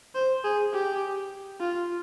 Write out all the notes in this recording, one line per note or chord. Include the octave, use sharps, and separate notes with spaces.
C5
G#4
G4
F4